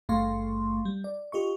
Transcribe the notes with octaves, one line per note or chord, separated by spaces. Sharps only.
G#1 G2 A3 F5 C6 C#6
G3
D5
F4 G4 D#5 C#6